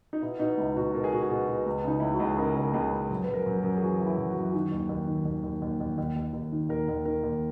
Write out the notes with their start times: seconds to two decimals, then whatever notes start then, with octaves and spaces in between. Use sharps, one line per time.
0.13 D#4
0.22 B2 E4
0.40 B2 D#4
0.58 C#2 E4
0.76 B2 F#4
0.94 B2 A#4
1.04 G#4
1.12 B2 F#4
1.23 G#4
1.30 B2
1.48 B2
1.66 C#2
1.84 C#3 D#4
2.00 C#2 E4
2.13 F#4
2.20 C#2
2.25 G#4
2.38 C#3 A#4
2.56 C#2 A#4
2.74 C#2 G#4
2.92 C#2
3.10 F#2
3.24 F#2 B4
3.34 A#4
3.46 F#2
3.58 A#4
3.63 F#2
3.77 G#4
3.82 E3 F#4
4.00 E3
4.06 E4
4.18 F#2
4.30 F#4
4.36 F#2 E4
4.51 D#3 F#4
4.72 D#2
4.89 D#2
5.08 D#3
5.25 D#2
5.44 D#2
5.62 D#2
5.80 D#2
5.98 D#2
6.16 D#2
6.33 D#2
6.52 D#3
6.69 D#2 A#4
6.88 D#2
7.05 D#3 A#4
7.24 D#2